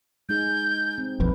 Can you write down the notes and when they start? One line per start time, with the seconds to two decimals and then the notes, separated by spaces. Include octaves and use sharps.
0.29 G#3 D#4 G#4 G6
0.98 C4
1.20 D#1 A#1 F2 B4